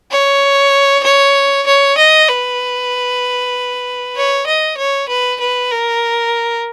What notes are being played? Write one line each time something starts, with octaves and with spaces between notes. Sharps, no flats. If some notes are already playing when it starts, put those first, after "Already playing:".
C#5
C#5
C#5
D#5
B4
C#5
D#5
C#5
B4
B4
A#4